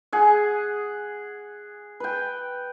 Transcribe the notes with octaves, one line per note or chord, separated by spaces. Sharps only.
G#4 F#5
B4 G5